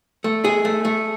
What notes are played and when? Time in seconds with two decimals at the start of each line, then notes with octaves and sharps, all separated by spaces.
0.24 A3
0.45 G#4
0.65 A3
0.85 A3